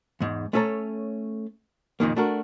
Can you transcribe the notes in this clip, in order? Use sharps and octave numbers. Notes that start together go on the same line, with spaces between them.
E2 G#2
A3 C#4 A4 C#5 A#5
F2 A#2 D#3 A#3
A3 D4 F#4 A#4